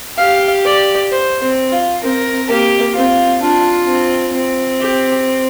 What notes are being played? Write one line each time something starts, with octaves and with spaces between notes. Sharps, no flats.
G4 F5
D5
C5
C4
F4
C4 A#4
A#3 G4
C4 F4
D4 F4
C4
C4
G4